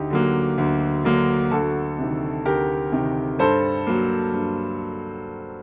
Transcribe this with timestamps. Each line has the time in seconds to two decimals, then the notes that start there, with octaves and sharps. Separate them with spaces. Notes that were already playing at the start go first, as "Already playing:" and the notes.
Already playing: D2 D#4 G4
0.10 D3 F#3 A#3
0.58 D2
1.04 D3 F#3 A#3
1.51 D2 F#4 A4
1.99 C3 D#3
2.45 D2 G4 A#4
2.92 C3 D#3
3.39 G2 A4 C5
3.87 F#3 A#3
4.33 G2